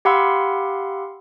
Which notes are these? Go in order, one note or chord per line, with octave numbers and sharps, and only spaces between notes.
G4 F5 F#5 B5 C6 E6